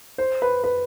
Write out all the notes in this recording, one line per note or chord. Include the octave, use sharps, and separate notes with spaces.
C5
B4
B4